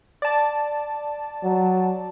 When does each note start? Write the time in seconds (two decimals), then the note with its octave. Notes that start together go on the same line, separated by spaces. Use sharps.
0.22 D5 A5
1.44 F#3